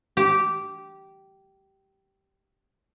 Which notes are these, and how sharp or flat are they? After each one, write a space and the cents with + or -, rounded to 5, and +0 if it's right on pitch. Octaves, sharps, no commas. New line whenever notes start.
G4 -15